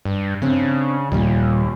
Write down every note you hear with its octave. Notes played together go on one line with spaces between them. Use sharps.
G2
C#3 C4 D4
D#2 A#2 G3